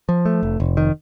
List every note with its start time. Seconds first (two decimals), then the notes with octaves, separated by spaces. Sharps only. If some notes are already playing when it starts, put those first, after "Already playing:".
0.09 F3
0.25 A3
0.43 F1
0.60 F1
0.77 D#3